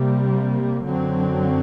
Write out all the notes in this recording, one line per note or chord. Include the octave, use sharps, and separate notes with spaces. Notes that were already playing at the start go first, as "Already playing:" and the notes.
Already playing: C3 G3 A#3
F#2 D3 F#3 C4